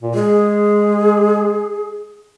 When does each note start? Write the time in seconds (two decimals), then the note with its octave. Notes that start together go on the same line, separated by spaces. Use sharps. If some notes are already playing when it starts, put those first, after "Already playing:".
0.02 A#2
0.15 G#3 G#4